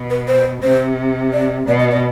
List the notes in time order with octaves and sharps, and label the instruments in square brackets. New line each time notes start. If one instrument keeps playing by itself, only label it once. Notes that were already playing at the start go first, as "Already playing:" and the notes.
Already playing: [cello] B2
[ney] B4
C5
[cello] C3 [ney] C5
[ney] D5
[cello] B2 [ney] D5
[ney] D#5
D5